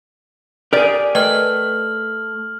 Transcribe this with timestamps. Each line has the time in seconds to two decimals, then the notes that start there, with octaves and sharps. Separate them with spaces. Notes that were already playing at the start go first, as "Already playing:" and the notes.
0.73 G4 G#4 A#4 D5
1.15 A3 B4 D#5 G5 F6 F#7